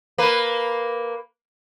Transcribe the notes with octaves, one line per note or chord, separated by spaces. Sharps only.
A#3 B4